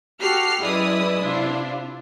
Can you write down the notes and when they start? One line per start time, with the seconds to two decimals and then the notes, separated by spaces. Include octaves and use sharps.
0.21 F#4 G4 A4 F6 C7
0.61 F#2 G#3 E4 B4 D5 D#6
1.21 C3 D4 E4 F4